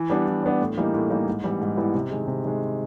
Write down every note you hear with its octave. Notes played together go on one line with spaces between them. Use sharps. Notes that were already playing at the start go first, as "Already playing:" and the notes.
Already playing: E3
G3 B3 D4
E3
G3 B3 D4
A2
E3 G3 A#3 D#4
A2
E3 G3 A#3 D#4
G#2
E3 G3 B3 E4
G#2
E3 G3 B3 E4
C3
D#3 G#3
C3
D#3 G#3